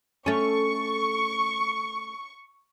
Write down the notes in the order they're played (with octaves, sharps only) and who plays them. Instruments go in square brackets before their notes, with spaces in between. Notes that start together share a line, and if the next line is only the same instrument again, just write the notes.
[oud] A3 C#4 [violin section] C#6